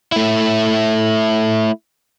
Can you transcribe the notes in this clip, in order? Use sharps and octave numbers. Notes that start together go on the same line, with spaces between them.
A3 E4